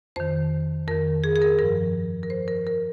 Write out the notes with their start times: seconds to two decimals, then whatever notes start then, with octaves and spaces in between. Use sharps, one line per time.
0.16 F2 D#3 C5
0.87 F2 D#3 A#4
1.24 G#4
1.36 G#4
1.42 A#4
1.59 G2 F3 A#4
2.23 A#4
2.30 G2 F3 C5
2.48 A#4
2.67 A#4